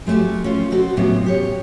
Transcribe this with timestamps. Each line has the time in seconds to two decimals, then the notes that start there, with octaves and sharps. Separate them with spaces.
0.07 G#3 A3 D4 F#4 G4
0.44 C#4 F4
0.71 B2 C4 F#4 A4
0.97 A2 C3 F#3 B3 C#4 F4
1.24 B3 G4 C#5